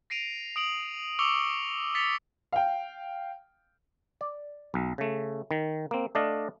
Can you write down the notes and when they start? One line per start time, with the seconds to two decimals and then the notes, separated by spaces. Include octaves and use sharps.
0.10 A#6 C7 D7 D#7 F7
0.56 D#6 D7 F#7
1.19 C#6 D6 E6 C#7 F7 G7
1.95 A6 B6 C#7 F7 G7
2.52 F5 G5
4.21 D5
4.74 B1
4.98 C#3 A3
5.51 D#3
5.91 A#3 C4
6.15 A3 D4 D5 D#5 F5